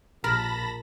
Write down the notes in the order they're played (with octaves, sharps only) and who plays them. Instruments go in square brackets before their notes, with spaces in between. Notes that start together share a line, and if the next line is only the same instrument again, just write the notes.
[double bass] A#1 [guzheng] A#4 [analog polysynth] A5 B5 A#6